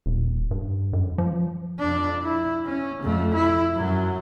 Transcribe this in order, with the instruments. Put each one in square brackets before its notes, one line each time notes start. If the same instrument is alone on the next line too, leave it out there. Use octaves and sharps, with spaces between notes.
[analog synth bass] D#1
G2
F#2
F3
[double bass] F2 D4
E4
C#4
F2 A3
E4
F#2 F#3